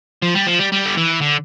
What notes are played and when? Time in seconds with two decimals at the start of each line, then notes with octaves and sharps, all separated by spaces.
0.22 F3
0.35 G3
0.47 F3
0.59 G3
0.72 G3
0.85 D3
0.97 E3
1.21 D3